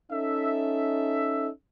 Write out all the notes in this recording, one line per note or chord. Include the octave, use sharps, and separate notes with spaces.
C#4 D#4 A4 E5